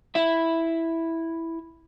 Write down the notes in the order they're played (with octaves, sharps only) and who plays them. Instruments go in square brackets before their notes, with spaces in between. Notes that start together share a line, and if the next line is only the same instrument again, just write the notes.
[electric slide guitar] E4 E5